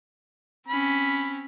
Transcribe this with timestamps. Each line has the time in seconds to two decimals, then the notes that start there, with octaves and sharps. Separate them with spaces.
0.68 C4 C#4 B5